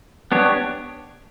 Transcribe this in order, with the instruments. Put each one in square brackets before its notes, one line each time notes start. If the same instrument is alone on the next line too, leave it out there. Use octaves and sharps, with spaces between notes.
[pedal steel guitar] B3 D4 G4 C#5